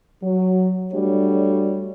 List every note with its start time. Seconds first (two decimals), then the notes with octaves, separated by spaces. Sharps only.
0.23 F#3
0.93 G3 A3 D4 F#4 C#5